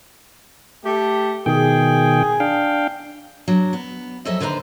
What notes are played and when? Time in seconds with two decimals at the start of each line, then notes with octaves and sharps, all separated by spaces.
0.84 A3 G4
1.46 B2 D#3 G#4 G5
2.40 D4 F5 G5
3.48 F#3 D4
3.73 B3
4.25 F2 F#3 A4 D#5 E5 G#5
4.40 D#2 D3 B4 C5 A5 A#5